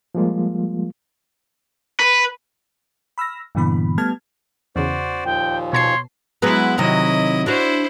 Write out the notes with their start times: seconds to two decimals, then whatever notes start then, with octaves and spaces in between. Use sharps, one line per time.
0.15 F3 G3 G#3 A#3 F4
2.00 B4
3.18 B5 E6 F6 A#6
3.55 G2 A#2 D3 E3 B3 B5
3.98 G3 A3 B3 A5 F6 G#6
4.76 E2 C#3 F#4 C5 D5
5.25 D#2 A#2 F3 G5
5.73 B2 C#5 A5 C6 C7
6.42 F#3 G#3 B3 E4 B4
6.78 C3 D#3 F#3 E4 D#5
7.46 D4 E4 F#4 C5 C#5